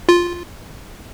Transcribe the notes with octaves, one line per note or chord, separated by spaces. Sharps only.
F4